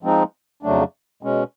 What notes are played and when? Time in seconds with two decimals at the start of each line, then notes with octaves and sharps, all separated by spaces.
0.03 F3 G#3 C4 D#4
0.63 F2 C#3 F#3 A3 D4
1.23 B2 G#3 C#4